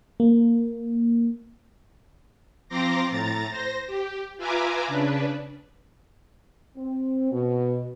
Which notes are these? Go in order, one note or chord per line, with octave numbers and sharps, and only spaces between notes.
A#3
F3 C4 A#5 C6 D6 A#6
A2 A#5 A6
C5 A#6
G4
F4 B4 E5 G#5 A#5 D6
C#3 D4 B4
C4
B2